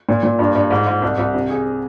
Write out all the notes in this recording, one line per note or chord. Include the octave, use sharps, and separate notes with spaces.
A#2
A#2
G2
G2
G#2
G#2
C2
C2
C3
G#4